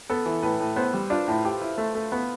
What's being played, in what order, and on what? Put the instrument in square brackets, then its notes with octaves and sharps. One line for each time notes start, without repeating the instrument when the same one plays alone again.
[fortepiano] B3 [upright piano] A4
[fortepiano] E3
[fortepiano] A2 [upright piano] B4
[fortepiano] A2
[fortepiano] B3 [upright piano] C5
[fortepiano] G3
[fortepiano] D4 [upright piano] F4
[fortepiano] A2
G4
E4
A3
A3
B3